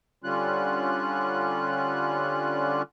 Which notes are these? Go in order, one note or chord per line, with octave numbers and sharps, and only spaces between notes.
D3 G3 C#4 F4 F#6